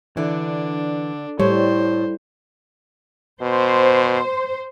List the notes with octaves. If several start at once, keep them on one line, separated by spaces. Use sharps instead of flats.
D3 E3 D4
A2 G3 C5 C#5
B2 C5